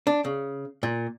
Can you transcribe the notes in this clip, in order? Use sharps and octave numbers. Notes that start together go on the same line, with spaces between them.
D4
C#3
A#2